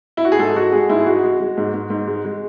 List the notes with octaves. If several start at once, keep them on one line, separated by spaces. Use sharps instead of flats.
E4
F#4
G#4
G#2 A4
G#3 F#4
G#3 G#4
G#2 E4
G#4
G#3 F#4
G#3
G#3
G#2
G#2
G#2
G#3
G#3